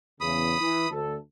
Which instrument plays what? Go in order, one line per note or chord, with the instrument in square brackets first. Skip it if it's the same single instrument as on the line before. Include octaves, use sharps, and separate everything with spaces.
[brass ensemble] E2 C#3 [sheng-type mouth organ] B5 D#6
[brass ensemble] E3
D2 A4